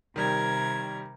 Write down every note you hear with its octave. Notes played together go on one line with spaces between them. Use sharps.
C3 D#3 G3 A#4 G#6